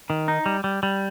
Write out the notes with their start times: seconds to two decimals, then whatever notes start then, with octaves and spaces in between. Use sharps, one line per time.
0.10 D#3
0.28 D#4
0.46 G3
0.64 G3
0.83 G3